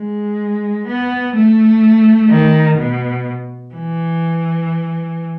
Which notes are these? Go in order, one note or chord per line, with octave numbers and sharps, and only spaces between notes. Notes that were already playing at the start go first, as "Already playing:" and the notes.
Already playing: G#3
B3
A3
D#3
B2
E3